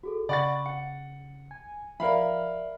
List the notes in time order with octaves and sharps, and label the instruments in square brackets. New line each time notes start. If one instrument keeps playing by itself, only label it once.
[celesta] F#4 G#4 A4
[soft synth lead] C#3 [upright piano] D5 F#5 A6 [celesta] B5 C#6
[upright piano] F#5 [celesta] C#7
[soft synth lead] G#5
[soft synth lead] F3 [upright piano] A#4 F5 B5 [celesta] D5 E5